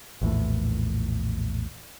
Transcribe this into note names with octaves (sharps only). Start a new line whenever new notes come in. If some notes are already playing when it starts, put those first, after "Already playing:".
A#1 E2 A2